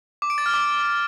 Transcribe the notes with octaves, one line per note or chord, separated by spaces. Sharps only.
D6
D7
A6
F6
D6